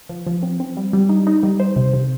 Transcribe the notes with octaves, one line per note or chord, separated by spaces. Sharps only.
F3
F3
C4
C4
G3
G3
D#4
D#4
G3
C5
C3
C3